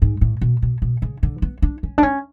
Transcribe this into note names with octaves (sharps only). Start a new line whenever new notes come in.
G#2
A2
B2
B2
B2
C#3
D3
B3
D4
C#4
D4
C#4